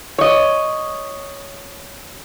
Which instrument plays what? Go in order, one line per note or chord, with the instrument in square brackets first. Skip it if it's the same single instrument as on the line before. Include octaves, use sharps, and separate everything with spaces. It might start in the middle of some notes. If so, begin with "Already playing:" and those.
[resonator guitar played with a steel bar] C#5 D#5